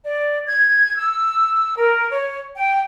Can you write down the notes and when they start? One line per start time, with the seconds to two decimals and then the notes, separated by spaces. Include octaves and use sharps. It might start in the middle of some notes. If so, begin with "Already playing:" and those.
0.04 D5
0.47 G#6
0.96 E6
1.75 A#4
2.09 C#5
2.56 G5